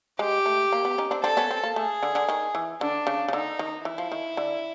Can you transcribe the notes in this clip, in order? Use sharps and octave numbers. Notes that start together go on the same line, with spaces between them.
G#3 G4
A3
A#3
B3
C#4 D#4
C4 D4
C4 D4 A4
B3 C#4
C4
A#3
A3 G#4
D3
D3
D#3
E3
D3 D4
C#3
C#3
D3 D#4
D#3
E3 E4
F3
D#3
D3